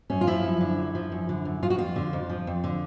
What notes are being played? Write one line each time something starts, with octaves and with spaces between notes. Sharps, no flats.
F#2 C#4
F4
F3 E4
F#2
D3
F#2
F3
F#2
D3
F#2
F3 F4
F#4
F2 F4
D3
F2
F3
F2
D3